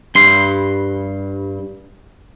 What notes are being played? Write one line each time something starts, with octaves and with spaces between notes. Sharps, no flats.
G2 C6